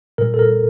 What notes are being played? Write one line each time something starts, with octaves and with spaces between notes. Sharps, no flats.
A#2 G3 A#4
A4
A#4